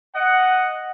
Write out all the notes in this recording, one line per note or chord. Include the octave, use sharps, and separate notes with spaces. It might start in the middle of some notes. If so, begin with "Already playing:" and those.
D#5 F#5